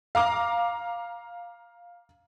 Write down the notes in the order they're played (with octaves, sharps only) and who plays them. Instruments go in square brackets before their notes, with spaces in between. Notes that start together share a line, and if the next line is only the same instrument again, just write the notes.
[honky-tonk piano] F5 A#5 D6